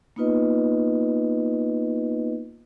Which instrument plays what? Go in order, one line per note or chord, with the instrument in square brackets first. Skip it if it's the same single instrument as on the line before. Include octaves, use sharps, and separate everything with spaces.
[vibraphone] A#3 B3 D#4 F4 B4 D#5